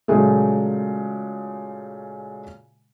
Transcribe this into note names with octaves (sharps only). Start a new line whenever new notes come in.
A#2 C#3 F#3 G#3 A3